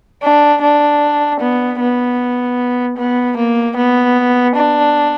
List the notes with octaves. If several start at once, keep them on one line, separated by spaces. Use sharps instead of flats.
D4
D4
B3
B3
B3
A#3
B3
D4